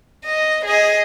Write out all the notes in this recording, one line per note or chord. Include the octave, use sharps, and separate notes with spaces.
D#5
G#4 D#5